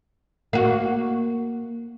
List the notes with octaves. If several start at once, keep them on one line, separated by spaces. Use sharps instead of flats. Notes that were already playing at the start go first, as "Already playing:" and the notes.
A#3 F#4